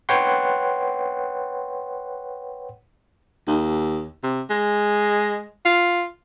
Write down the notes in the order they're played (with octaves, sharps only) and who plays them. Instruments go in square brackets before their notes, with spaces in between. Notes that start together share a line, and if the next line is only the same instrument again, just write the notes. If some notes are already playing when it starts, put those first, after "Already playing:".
[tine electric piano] B4 C#5 F#5 G5 C6
[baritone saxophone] D#2
C3
G#3
F4